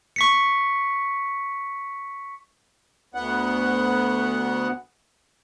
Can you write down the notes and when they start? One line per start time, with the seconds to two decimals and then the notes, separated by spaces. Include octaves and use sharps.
0.16 C#6 B6 C#7
3.14 D2 B3 F#5